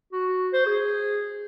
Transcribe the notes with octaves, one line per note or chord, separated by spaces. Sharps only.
F#4
C5
G#4